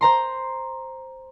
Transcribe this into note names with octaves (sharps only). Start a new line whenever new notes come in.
C5 A#5 C6